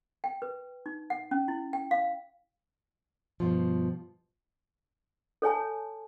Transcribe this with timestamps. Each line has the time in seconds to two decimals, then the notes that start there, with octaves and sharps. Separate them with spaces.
0.24 G5
0.42 B4
0.86 D#4
1.10 F#5
1.31 C#4
1.48 E4
1.73 G5
1.91 F5
3.40 G2 B2 F3
5.42 A4 C#5 G#5 A5